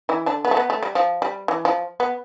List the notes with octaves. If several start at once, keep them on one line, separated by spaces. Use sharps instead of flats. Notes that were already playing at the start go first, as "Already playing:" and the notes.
E3 E4
D3 D4
B3
A3
B3
A3
G3
F3
G3
E3
F3
B3